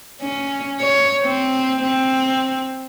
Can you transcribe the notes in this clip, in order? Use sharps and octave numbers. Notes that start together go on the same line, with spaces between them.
C#4
C#5
C4
C4